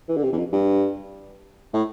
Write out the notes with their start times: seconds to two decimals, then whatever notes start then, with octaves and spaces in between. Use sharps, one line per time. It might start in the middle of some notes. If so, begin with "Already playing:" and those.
0.09 E3
0.17 D3
0.23 C3
0.33 E2
0.38 F2
0.53 G2
1.74 A2